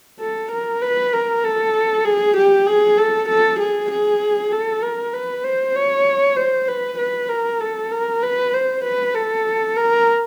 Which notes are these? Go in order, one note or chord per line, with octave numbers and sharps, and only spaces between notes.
A4
A#4
B4
A#4
A4
G#4
G4
G#4
A4
A4
G#4
G#4
A4
A#4
B4
C5
C#5
C5
B4
B4
A#4
A4
A#4
B4
C5
B4
A4
A#4